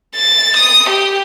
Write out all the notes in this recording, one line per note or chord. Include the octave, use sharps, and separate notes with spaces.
A6
D#6
G4